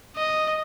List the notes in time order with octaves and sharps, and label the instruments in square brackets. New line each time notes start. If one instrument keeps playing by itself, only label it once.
[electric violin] D#5